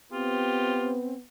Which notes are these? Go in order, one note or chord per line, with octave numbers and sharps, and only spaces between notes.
B3 C4 F4 G4